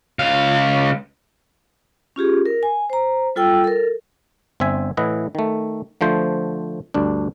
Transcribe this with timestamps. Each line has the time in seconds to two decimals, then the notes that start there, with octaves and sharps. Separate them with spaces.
0.19 C#2 F5
2.16 C#4 F4 G4 G#4
2.46 A#4
2.63 G#5
2.90 C5 A#5
3.36 G3 F4 A4 G5 E6
3.64 A4 A#4
4.60 G1 C4 E5 G#5
4.97 A2 E3 E4 D#5 F#5
5.35 D#3 A3
6.01 D3 F3 A3 C5
6.94 D2 G2 D4